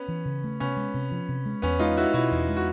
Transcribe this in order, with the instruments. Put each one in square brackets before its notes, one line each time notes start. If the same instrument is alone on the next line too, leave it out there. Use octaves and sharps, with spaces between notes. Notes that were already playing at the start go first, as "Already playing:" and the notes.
Already playing: [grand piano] B3 C#4
[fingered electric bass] E3
C#3
A3
[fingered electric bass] C3 [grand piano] B3 C#4
[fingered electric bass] G#3
C3
F3
C3
G#3
[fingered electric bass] E2 [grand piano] B3 C#4
[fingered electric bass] G#3 [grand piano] D#4 F4
[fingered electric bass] C#4 [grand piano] E4 F#4
[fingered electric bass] B2 [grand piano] E4 F#4
[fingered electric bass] E2
G#3
[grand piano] F#4